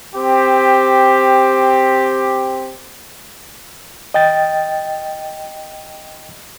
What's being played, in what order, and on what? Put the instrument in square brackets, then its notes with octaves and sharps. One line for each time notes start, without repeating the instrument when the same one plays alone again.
[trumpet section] C4 G4
[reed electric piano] D#5 G5 A6